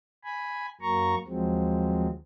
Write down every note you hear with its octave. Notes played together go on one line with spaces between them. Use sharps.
G#5 B5
F#2 F#3 A#3 A#5 C#6
D#2 F3 F#3 G#3 C4